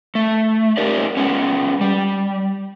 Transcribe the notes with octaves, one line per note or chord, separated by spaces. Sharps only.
A3
D#4 G4 A#4 D5
G#3 B3 C#4
G3